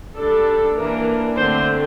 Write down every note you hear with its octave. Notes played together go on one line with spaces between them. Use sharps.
G3 D4 A4
E3 A#3 D4 A#4
D3 A3 C4 C5